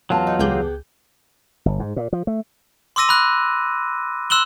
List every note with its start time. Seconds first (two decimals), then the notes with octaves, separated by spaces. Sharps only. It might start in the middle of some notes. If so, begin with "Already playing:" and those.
0.10 E2 F#3 F4 A5
0.27 D#4
0.39 C#2 B3 G4 G#4 G6
1.66 G1
1.80 G#2
1.96 A#2
2.13 F3
2.27 A3
2.96 C6 D6 E6 A#6 D#7
3.09 B5 F#6
4.30 C6 E6 F#6 E7 F#7 G7